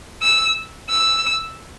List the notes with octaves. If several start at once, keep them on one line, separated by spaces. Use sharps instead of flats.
E6
E6